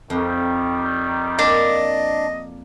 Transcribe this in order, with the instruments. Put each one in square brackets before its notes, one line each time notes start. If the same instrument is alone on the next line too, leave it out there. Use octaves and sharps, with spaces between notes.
[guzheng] F2 [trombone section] D#3 G3
[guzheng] A#3 [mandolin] D4 [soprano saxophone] D#5